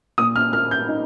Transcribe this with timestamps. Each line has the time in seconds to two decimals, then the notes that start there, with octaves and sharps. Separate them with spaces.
0.18 A#2 D#6
0.36 F6
0.53 A#3 F6
0.71 G6
0.88 D#4